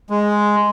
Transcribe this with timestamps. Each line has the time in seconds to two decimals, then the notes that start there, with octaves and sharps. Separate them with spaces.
0.10 G#3